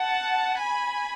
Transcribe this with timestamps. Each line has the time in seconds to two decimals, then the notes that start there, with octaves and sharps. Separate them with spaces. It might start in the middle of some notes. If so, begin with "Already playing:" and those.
Already playing: F#5 A5
0.60 G#5 B5